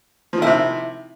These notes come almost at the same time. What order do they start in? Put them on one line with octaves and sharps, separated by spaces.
F3 D#3 E4 C3